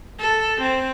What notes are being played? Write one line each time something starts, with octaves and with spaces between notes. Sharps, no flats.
A4
C4